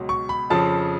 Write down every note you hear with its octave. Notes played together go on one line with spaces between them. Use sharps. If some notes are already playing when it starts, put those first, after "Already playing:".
Already playing: C#2 B2 F#3
C#6
B5
F2 C#3 F3 A5